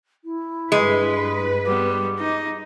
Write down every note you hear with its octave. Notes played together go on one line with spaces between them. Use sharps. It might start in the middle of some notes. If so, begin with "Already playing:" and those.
E4
G2 G#3 B4
G3 B3 D6
D#4